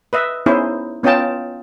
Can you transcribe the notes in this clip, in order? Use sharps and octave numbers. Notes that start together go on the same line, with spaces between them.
B4 D#5 E5
B3 C#4 D#4 E4 G#4 C5
B3 C#4 F4 D#5 G5 A5